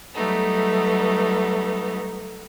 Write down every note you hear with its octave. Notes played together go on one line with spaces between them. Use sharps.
F#3 G3 A3 B3 D#4